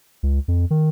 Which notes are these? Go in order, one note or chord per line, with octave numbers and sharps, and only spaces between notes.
C#2
F2
D#3